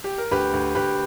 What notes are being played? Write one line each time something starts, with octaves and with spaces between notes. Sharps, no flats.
G4
A#4
D2 G4 B4
D2
D2 G4 B4